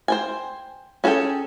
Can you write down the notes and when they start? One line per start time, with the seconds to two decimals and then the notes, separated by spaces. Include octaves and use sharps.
0.08 C5 G5 G#5
1.04 C#4 F#4 G#4 A4 G5